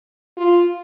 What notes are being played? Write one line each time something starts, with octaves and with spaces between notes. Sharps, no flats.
F4